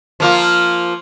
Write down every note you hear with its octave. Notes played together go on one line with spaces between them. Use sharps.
F3 A#3 F4